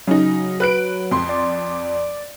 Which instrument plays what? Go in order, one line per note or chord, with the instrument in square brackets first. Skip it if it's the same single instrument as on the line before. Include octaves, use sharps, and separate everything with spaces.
[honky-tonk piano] C#3 D#4 [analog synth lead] F#3
[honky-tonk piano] B4 F#6 D7
F2 C6
[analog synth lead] D5